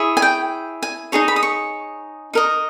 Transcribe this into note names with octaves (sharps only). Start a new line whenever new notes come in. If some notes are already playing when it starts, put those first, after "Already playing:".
Already playing: E4 G#4 C#5
G#5
G5
G#5
D#4 G#4 C#5 A#5
B5
D#6
C#6
D#4 A#4 D#5